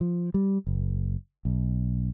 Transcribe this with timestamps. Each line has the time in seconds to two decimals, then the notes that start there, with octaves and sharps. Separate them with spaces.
0.01 F3
0.34 G3
0.67 F#1
1.45 B1